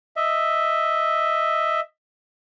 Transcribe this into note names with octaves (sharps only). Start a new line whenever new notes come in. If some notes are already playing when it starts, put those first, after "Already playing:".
D#5 E5